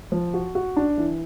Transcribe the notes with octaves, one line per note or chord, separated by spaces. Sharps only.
F3
F#4
F#4
D4
E3